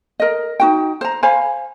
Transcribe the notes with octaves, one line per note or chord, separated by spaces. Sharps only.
A#4 D#5
D#4 F#4 G5
C5 A#5
C5 F5 G#5 B5